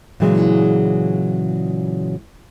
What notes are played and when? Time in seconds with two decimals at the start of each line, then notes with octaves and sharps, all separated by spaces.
0.20 A#2 C#3 E3 F#3 G#3